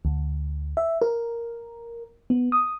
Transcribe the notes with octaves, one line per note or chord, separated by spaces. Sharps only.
D2
E5
A#4
B3
D#6